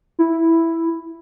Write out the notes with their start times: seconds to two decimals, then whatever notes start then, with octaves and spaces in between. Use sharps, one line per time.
0.19 E4